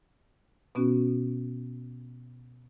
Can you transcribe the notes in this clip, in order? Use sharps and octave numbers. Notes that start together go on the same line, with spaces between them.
B2 B3 C#4 F#4